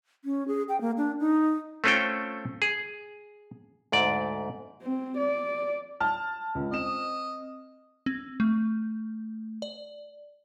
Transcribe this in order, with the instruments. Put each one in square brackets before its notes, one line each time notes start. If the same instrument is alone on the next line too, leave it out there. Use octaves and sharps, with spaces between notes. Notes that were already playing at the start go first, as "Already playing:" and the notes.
[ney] C#4
G#4
G5
A#3
D4
D#4
[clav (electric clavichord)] A3 C4 C#4 F4 A4 G5
G#4
D2 G#2 D5
[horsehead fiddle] C4
D5
[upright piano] A5 F6
C#2
[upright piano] C4 E7 [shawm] D#5
[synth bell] C4
A3
D5